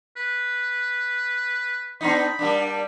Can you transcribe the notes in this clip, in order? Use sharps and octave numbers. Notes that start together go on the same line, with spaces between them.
B4
B3 D4 D#4 B5
G3 A#3 D4